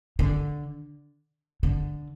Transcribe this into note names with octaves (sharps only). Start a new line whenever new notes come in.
D3
D3